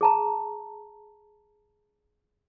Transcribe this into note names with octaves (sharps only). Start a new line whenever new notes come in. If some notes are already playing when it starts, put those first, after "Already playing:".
G#4 A5 A#5